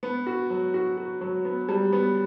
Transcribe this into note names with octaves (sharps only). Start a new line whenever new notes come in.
B3
F#4
F#3
F#4
F#4
F#3
B3
G3
B3